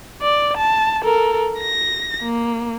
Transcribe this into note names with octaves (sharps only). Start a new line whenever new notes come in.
D5
A5
A4 A#4
A#6
A#3